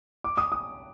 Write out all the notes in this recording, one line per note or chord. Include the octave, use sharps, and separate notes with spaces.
D6
D#6
D#6